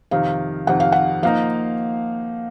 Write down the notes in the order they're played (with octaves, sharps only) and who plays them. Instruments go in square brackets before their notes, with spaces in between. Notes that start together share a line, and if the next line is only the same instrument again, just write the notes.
[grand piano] F2 C3 D#3 [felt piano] F5
[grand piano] F2 C3 D#3 [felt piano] F#5
[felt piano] F5
F#5
[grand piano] F3 A#3 D#4 [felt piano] F5